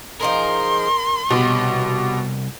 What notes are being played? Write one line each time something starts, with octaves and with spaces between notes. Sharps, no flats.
F3 D#4 G#4 A#4 C6
C2 B2 G4 D#5